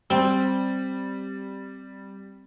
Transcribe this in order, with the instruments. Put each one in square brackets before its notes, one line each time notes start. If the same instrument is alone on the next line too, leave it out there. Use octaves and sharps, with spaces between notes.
[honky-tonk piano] G3 [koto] C4